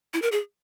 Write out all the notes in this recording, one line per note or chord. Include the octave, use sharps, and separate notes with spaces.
E4
A#4
G#4